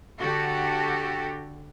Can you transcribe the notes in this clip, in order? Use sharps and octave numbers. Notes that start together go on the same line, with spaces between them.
D3 F#4 G4 A4